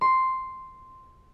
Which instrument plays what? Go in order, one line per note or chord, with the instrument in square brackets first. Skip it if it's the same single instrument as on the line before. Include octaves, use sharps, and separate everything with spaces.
[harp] C6